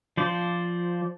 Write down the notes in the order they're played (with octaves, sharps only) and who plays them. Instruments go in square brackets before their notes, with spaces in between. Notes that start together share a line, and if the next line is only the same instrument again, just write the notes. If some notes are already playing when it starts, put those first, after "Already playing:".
[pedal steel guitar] F3 C5 D5